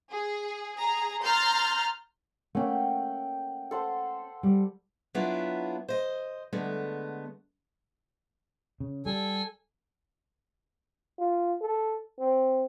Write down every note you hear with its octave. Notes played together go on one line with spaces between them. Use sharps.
G#4
G#4 A#5
A#5 C6 F6 G6 A6
A3 A#3 C#4 F#5 G5
A4 C5 F#5
G3
F#3 B3 D4 E4 F4
C5 D#5
D3 G#3 A3 B3
C#3
G3 A4 G#5
F4
A4
C4